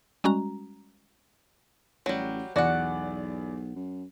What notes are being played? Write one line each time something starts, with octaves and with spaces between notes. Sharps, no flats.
G3 G#3 C#4 F#4 A#5
A1 F#3 G3
B1 E2 F#4 D5 F#5
F#2